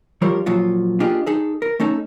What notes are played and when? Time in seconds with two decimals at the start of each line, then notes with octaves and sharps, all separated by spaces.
0.22 F3 G3 F4 A#4 C5 C#5
0.46 A#2 F3 F#3 F4
1.00 A#3 D4 F4 G4 G#4 D#5
1.26 D#4 G#4 A4
1.62 A#4
1.80 A3 C#4 D#4 A4